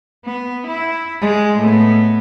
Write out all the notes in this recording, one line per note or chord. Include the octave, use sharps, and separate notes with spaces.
B3
E4
G#3
A2 B3